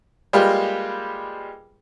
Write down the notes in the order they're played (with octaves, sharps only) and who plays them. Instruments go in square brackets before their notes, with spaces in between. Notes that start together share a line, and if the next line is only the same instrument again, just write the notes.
[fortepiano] G3 G#3 A#3 F4 G4 B4